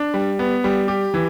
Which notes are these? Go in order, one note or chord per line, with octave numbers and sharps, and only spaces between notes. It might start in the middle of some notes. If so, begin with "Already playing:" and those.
Already playing: D4
G3
B3
G3
G4
E3